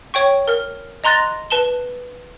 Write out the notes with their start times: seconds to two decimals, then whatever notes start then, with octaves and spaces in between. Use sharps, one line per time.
0.14 C#5 G5 C#6
0.48 A#4 F6
1.04 D#5 A#5 C6 F#6 A6 A#6
1.50 B4 A5 E7 G7